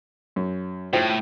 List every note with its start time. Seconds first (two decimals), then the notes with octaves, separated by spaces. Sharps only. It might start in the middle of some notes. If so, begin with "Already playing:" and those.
0.36 F#2
0.93 A2 F4 C5 G5